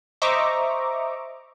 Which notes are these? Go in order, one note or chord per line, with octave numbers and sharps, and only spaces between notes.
C5 D#5 E5 A#5 C#6 D6